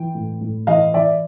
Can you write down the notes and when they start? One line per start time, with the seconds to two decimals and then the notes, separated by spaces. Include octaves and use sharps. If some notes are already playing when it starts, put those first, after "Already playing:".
Already playing: E3 G5
0.15 A2
0.41 A2
0.67 E3 D#5 F5
0.94 E3 D5 E5